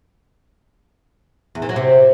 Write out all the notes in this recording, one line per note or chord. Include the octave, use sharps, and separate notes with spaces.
E2
E3
F#3
C3